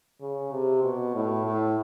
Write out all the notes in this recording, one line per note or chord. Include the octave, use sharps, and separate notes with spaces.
C#3
C3
B2
A2
A2